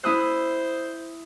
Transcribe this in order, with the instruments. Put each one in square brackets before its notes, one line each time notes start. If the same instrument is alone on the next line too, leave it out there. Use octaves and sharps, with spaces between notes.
[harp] E4 D#6 F#6 [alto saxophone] C5